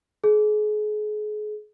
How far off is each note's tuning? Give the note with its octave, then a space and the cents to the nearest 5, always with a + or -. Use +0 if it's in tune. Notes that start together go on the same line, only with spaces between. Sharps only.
G#4 +35